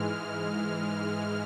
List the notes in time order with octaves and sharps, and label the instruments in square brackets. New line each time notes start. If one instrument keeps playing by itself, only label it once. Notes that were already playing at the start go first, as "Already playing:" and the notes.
Already playing: [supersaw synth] G#2 E3 G#3 F6